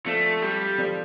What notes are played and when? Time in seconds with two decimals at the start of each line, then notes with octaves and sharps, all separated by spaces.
0.06 F3 A3 C4 F4 A4 D5
0.42 G3
0.78 F3 C4 F4 A4 D5